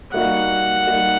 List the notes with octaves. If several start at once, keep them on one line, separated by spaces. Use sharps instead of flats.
G3 A#3 D#4 F#4 F#5
G3 A#3 D#4 F#4